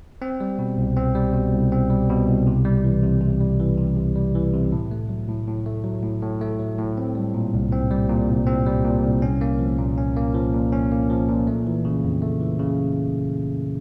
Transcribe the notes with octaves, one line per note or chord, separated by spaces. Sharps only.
C4
G3
B2
C2
C4
G3
B2
C2
C4
G3
B2
C2
C3
G3
E3
C3
C3
G3
E3
C3
C3
G3
E3
C3
A2
A3
F#3
A2
A2
A3
F#3
A2
A2
A3
F#3
A2
C4
G3
A#2
C2
C4
G3
A#2
C2
C4
G3
A#2
C2
C#4
A#3
F3
A#2
C#4
A#3
F3
A#2
C#4
A#3
F3
A#2
A3
E3
C#3
F2
A3
E3
C#3